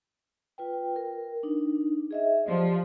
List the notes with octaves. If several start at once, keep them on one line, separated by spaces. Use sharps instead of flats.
F4 B4 G5
A#4
D4 D#4
G#4 D#5 E5
F3 G4 D5